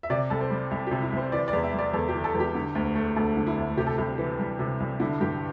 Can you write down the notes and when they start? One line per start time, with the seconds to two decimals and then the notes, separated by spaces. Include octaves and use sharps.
0.03 E5
0.10 C3 D5
0.30 C2 A4
0.41 C5
0.50 G3
0.71 C2
0.87 C3 G4
1.02 E4
1.12 C2 C5
1.32 E3 D5
1.48 D5
1.53 E2
1.63 E5
1.73 G3
1.79 D5
1.94 E2 A4
2.08 G4
2.14 E3
2.24 A4
2.35 E2
2.40 G4
2.55 D3
2.75 D2
2.95 A3
3.16 D2 A4
3.37 D3
3.47 E4
3.57 D2
3.77 C3 G4
3.87 A4
3.97 C2 G4
4.18 E3
4.39 G3
4.59 C3
4.80 C2
5.00 D3 E4
5.20 G2 G4